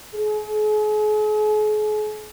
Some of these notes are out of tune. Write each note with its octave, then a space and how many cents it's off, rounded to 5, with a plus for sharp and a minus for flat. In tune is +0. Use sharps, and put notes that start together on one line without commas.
G#4 +40